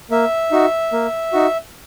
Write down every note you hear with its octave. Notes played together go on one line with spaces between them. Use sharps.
A#3 E5
D#4 F#4
A#3
D#4 F#4